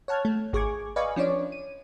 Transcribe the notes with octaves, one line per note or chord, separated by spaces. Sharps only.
C#5 F#5 A5 F6 G#6
A3
G#1 G#4 C#6 D6 G#6
B4 D5 D#5 F5 G#5 C#6
F3 C#4 D4 C#5 D5
D#7